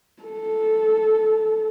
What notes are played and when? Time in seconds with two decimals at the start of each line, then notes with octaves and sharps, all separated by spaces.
0.22 A4